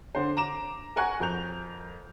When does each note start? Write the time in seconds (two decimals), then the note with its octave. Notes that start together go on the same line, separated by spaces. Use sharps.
0.15 D3 C5
0.37 A#5 D6 E7
0.96 A#4 F#5 G#5 C#6 F#6
1.20 F2 A#4 G6 F7